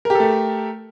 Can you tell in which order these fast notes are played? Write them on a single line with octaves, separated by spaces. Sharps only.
A#4 G4 A4 A3